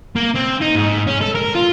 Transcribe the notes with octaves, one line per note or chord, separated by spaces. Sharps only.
A#3
C4
D#4
G#2
C#4
A4
A#4
F4